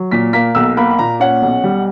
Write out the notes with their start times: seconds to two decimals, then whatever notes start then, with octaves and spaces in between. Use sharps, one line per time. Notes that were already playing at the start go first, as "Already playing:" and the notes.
Already playing: F#3
0.11 A#2 B6
0.33 A#3 B6
0.55 B1 E6
0.77 A#3 B5
0.91 B5
0.99 A#2 A#5
1.20 C#4 F#5
1.42 B1
1.63 G3